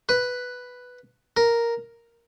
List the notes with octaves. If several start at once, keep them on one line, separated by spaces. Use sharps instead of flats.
B4
A#4